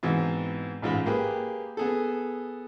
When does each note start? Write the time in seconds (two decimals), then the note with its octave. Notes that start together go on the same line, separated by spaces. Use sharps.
0.03 G#2 B2 E3 C4
0.82 A1 G#2 F4 B5
1.06 A#3 G4 G#4 B4
1.77 B3 G#4 A4